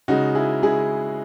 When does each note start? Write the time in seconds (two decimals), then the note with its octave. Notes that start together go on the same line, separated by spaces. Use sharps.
0.08 C#3 G#3 D#4 F#4
0.35 E4 G#4
0.63 C#3 G#3 E4 G#4